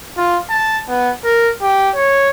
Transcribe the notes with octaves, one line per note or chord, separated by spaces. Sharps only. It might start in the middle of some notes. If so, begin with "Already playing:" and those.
F4
A5
B3
A#4
G4
C#5